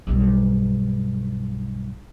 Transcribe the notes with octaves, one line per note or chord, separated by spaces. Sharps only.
B1 G2